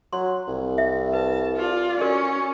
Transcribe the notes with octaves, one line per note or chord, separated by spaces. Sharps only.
F#3 C6
C2
E5
B4 A5
F4 D5
C#4 F#4 A#4 D5